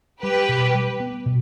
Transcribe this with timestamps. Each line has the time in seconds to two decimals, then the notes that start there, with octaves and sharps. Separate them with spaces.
0.23 G3 G4 B4
0.49 B2
0.75 G3
1.00 B3
1.26 B2